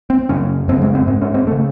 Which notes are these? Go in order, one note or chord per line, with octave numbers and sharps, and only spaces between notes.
C4
F#2 C#3 C#4
F#2 C#3 C4
G#3
C4
G#2 C4
C#4
C4
A3
C#3